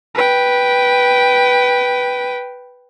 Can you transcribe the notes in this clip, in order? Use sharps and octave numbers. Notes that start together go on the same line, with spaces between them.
B4 G5